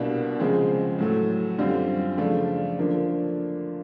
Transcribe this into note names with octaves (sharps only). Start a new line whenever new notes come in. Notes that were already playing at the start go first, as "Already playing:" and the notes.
Already playing: C2 B2 G3 A#3 D4
C#3 F3 G#3 C4
A2 F#3 A3
F#2 D3 G3 C4 F4
C#3 F3 A3 D4 F4
D3 F3 A#3 D4 F4